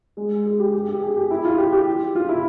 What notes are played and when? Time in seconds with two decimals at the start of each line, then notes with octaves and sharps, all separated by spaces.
0.17 G#3
0.46 G#4
0.59 G4
0.73 G4
0.88 G4
1.02 G#4
1.17 G4
1.31 E4
1.45 F4
1.58 G4
1.73 G4
2.15 F4
2.29 E4